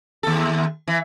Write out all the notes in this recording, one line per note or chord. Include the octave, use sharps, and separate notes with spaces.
D#2 A4
E3